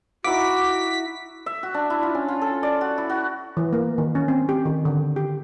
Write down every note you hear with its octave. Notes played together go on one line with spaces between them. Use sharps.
D#4 E4 F#4 F#5 D6 B6
E5
F#4
D4
E4
F4
C#4
F4
A4
D5
F#4
E4
F#4
E3
A#3
D#3
C#4
C4
G4
D#3
D3
G4